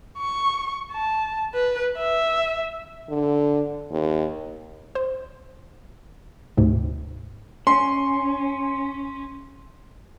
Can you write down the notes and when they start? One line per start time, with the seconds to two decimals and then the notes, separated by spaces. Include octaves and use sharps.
0.18 C#6
0.92 A5
1.54 B4
1.97 E5
3.09 D3
3.91 D#2
4.95 C5
6.57 D2 G#2 C3
7.67 C#4 C6